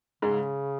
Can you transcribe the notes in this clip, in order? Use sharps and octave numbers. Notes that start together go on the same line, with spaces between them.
G#2 C#3 G#3